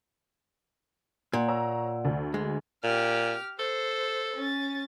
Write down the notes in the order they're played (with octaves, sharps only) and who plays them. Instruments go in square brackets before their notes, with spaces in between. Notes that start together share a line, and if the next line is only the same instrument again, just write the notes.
[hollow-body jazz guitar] A#2 [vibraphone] D5 F#5
[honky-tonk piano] C#5 A#5 E6
D2
[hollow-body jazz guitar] G#3
[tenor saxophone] A#2 [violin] G4 F6
[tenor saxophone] A4 [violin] C5
[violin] C#4 A6